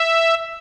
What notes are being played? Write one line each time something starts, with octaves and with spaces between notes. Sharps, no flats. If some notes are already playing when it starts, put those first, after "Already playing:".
Already playing: E5